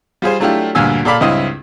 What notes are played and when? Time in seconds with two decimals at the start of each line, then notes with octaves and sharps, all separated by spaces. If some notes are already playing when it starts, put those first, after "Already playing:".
0.22 G3 F4 G#4 C5
0.40 F#3 A3 D4 E4 F4 G4
0.75 D2 G2 A#2 F5 G#5 E6
1.05 A#2 A4 D5 F5 B5 D6
1.20 C#2 G2 C4 E4 D#5 F5